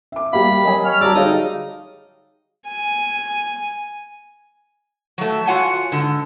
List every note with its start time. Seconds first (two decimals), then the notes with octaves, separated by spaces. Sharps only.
0.12 E5 D6
0.33 G3 A#3 F5 B5
0.63 F#3 A#4 D#5 G#5
0.85 C#5 F6
1.01 F#3 G3 D5 A5 A#5 E6
1.15 D3 A3 D#4 G#4 C#5 D#5 F5
2.68 G#5
5.18 F#3 A3
5.47 F4 F#4 C#5 F#5 G#5
5.92 G#2 D3